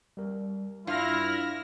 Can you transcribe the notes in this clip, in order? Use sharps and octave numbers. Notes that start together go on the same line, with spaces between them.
G3 A#4
G2 D4 E4 F4 F6 A#6